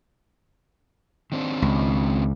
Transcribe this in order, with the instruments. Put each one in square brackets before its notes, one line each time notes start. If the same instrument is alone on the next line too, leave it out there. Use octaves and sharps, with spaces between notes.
[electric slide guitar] D#3 C4 D4
[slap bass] C#2